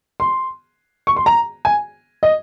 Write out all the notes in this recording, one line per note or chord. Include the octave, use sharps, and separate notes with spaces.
C6
C#6
C6
A#5
G#5
D#5